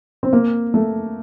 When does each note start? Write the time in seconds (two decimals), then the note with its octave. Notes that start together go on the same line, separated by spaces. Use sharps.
0.23 C4
0.33 A#3
0.74 A3